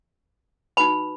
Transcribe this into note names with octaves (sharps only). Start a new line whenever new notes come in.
D#4 F#4 B4 B5